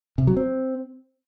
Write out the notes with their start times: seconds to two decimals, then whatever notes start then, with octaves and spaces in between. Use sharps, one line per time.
0.18 C3
0.27 F#3
0.37 C4